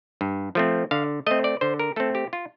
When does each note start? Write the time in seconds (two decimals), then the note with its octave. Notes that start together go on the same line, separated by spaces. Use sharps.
0.21 G2
0.55 F3 A3 C4
0.91 D3 F5
1.26 A3 C4 D#5
1.44 D5
1.61 D3 C5
1.80 A#4
1.96 A3 C4 A4
2.15 G4
2.33 F4